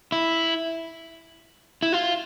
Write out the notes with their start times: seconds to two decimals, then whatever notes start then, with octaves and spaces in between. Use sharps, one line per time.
0.12 E4
1.83 E4
1.93 F4